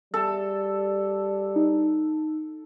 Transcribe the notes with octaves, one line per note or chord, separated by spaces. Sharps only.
G3 A4
D#4